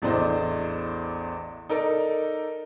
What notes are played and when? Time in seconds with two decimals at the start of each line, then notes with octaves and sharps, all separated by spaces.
0.02 A1 E2 A3 D4 C5 D#5
1.69 D#4 A4 A#4 D5